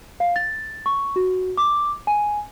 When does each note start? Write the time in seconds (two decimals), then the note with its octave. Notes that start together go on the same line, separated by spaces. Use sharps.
0.20 F5
0.36 A6
0.86 C#6
1.16 F#4
1.57 D6
2.07 G#5